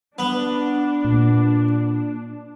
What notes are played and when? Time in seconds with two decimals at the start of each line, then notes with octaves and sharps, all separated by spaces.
0.18 B3 D4
1.05 A#2